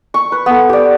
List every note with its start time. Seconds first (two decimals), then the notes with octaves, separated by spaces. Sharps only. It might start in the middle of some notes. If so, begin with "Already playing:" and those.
0.14 C#6
0.32 B4
0.46 B3 A4
0.69 G4 D5